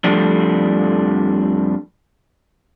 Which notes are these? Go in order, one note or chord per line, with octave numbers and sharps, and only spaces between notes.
F2 F3 G3 A3 D4